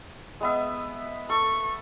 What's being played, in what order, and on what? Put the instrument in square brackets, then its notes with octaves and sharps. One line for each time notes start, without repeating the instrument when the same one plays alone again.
[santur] G#3 B3 E5
[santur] A4 [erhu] C#6